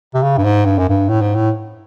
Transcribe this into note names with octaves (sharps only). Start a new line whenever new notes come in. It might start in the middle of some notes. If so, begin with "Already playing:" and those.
C3
C#3
G2
G#2
G2
F#2
G2
A2
G#2
A2